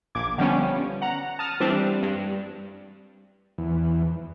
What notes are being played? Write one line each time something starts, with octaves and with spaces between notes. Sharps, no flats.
A#1 D6 G#6
D3 F3 G3 B3 C#4
F#5 A#5
A5 D#6 F6
E3 G3 C4 D4
G2
E2